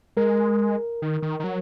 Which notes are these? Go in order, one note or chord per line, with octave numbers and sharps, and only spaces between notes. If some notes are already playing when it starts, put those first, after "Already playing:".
G#3 A#4
D#3
D#3
D#3
F#3